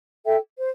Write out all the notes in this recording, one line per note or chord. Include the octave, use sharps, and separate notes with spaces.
A4 E5 G5
C5